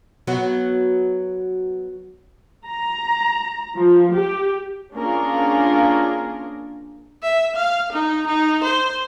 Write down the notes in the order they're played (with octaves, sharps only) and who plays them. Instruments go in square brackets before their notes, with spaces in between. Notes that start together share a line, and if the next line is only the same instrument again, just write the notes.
[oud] F#3 B3 F#4
[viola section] A#5
F3
G4
A#3 C#4 D4 F4 G#4 A#4
[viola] E5
F5
D#4
D#4
C5